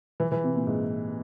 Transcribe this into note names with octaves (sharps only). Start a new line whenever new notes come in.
E3
E3
C3
A#2
G#2